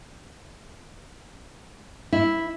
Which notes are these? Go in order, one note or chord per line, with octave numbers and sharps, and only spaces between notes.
E4